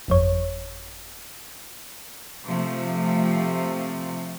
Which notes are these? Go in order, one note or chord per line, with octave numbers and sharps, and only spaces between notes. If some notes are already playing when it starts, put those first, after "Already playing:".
G1 F2 C#5
C3 F3 A3